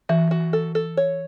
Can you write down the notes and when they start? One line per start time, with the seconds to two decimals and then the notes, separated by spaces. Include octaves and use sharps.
0.09 E3 F#4
0.31 F#4
0.53 A4
0.75 A4
0.97 C#5